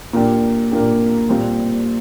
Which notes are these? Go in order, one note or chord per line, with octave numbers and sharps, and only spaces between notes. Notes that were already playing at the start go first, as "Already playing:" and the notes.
A#2 A#3 D4 G4
A#2 A#3 D4 G4
A#2 G3 C4